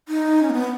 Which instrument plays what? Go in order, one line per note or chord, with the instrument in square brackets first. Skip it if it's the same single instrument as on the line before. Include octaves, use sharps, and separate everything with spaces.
[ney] D#4
C#4
A#3
B3